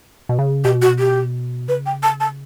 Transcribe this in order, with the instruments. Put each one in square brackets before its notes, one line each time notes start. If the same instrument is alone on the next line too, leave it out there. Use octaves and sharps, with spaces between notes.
[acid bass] B2
C#3
[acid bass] B2 [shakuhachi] G4
[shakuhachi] F#4
G4
[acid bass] C#3 [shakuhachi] B4
[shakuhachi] G5
A5
A5